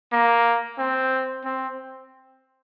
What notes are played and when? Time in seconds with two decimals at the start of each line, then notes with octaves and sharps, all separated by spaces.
0.12 A#3
0.78 C4
1.45 C4